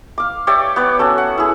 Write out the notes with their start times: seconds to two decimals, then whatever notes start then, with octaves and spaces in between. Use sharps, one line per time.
0.18 F5 D6
0.47 G4 C#5 D5 E5
0.76 B3 C#5 D5
0.99 C#4 F#4 A4
1.18 F#5
1.38 E4 G#4